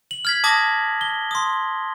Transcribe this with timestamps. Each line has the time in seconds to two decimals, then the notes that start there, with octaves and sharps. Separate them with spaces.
0.11 F#7
0.25 F6 G#6 B6
0.44 A5 D6 D#6 G#6 A#6
1.01 G7
1.31 C6 D#6